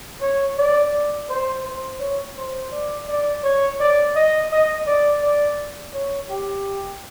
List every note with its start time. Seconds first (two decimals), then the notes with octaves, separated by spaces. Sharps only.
0.21 C#5
0.58 D5
0.93 D5
1.29 C5
1.64 C5
2.00 C#5
2.37 C5
2.72 D5
3.08 D5
3.43 C#5
3.80 D5
4.15 D#5
4.51 D#5
4.86 D5
5.22 D5
5.94 C#5
6.30 G4